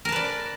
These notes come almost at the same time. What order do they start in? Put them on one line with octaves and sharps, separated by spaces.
A#4 A5 B4 D5